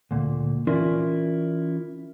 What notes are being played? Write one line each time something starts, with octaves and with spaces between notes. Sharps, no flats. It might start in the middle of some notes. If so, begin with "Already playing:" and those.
D2 A#2
E3 C#4 E4 F4 A#4 D5